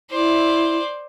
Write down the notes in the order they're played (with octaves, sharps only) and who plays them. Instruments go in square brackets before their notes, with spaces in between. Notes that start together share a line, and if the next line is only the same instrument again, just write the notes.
[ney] E4 [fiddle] C5 D5